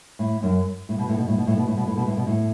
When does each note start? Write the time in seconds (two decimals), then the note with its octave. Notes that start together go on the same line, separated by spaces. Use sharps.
0.19 A2
0.43 F#2
0.89 A2
0.98 B2
1.09 A2
1.18 B2
1.28 A2
1.38 B2
1.47 A2
1.58 B2
1.68 A2
1.77 B2
1.87 A2
1.97 B2
2.07 A2
2.17 B2
2.27 A2